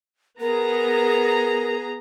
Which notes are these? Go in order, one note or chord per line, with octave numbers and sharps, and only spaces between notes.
B3 G#4 A#4 A#5